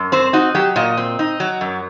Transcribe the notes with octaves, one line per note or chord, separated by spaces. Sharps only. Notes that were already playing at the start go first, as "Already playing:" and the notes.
Already playing: F#2
C4 C5
D#4 F#4
F#3 G4
A#2 D#5
C4
D#4
F#3
F#2